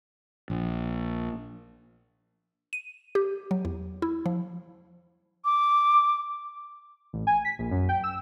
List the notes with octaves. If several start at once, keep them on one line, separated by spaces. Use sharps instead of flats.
A#1
D#7
G4
F#3
E2
E4
F3
D6
A1
G#5
B6
A#1
F#2
G5
E6